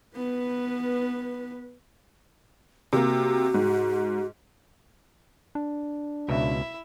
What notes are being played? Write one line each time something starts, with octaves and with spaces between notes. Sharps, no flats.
B3 B4
C3 A#3 F#4
G#2
D4
C#2 B2 E4 E5